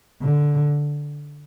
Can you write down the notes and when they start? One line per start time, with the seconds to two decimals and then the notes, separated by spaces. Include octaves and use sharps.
0.22 D3